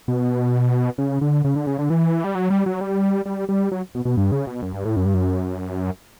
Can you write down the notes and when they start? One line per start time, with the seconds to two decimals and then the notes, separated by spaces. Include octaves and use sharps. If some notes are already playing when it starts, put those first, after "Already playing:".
0.08 B2
0.98 C#3
1.21 D3
1.44 C#3
1.56 D3
1.67 C#3
1.79 D3
1.90 E3
2.24 G3
2.35 F#3
2.50 G3
2.66 F#3
2.81 G3
3.26 G3
3.49 G3
3.71 F#3
3.95 B2
4.05 B2
4.17 G2
4.32 C#3
4.47 B2
4.62 F#2
4.74 G2
4.85 A2
4.96 F#2
5.06 G2
5.14 F#2